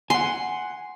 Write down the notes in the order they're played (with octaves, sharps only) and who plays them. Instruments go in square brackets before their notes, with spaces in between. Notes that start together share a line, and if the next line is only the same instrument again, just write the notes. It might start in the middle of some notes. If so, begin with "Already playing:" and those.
[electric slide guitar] F#5 G#5 [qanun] C6